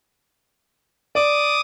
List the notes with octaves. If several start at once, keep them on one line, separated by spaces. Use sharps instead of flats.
D5 D6 D#6